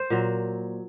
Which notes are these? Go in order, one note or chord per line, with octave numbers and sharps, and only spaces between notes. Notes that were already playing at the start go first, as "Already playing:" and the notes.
Already playing: C5
A#2 F#3